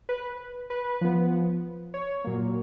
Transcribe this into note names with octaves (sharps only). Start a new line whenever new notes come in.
B4
B4
F3 B3
C#5
A#2 F#3 A#3